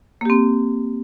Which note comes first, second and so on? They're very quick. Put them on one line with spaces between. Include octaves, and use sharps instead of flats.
A#3 G4 C4